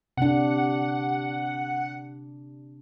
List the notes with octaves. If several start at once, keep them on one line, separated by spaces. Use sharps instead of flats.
C3 D4 F#5